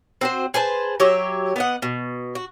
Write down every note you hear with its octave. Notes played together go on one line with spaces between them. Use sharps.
C4 F#4 C5
G#4 B4 C5 A5
F#3 G4 C#5 E5
B3 D#5 F#5
B2
F#4